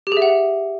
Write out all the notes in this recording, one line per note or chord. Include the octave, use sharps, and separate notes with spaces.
G4
G#4
E5
F#5